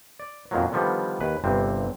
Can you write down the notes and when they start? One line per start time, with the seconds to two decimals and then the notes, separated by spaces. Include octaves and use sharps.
0.20 D5
0.51 F2 A#2 D#3 F3 F#3
0.72 D3 D#3 F3 G3 B3
1.20 D#2 B4
1.44 G1 G2 C3 C4